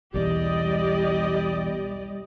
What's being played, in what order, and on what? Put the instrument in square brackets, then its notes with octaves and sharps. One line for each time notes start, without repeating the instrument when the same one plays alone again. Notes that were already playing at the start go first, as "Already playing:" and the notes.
[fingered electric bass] B1 E2 [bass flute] G3 [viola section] G4 D5 D#5